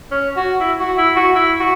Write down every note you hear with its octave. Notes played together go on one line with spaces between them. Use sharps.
C#4
F#4
E4
F#4
E4
F#4
E4
F#4